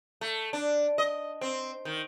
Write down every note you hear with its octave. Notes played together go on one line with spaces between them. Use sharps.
A3
D4
D#5
C4
D#3